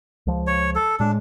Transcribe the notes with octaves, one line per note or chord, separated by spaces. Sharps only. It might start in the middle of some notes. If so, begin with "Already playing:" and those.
C#2 F3
C#5
A4
A2 G#3 D4